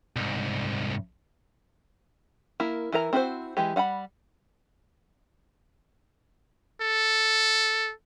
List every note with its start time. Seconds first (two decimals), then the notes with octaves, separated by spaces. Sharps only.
0.16 C2 G#2
2.60 A#3 E4 A#4
2.92 E3 E4 A#4 A#5
3.13 C4 E4 F#4 G#4 C5
3.57 E3 G#3 G4
3.76 G3 F#5 G#5 B5
6.81 A4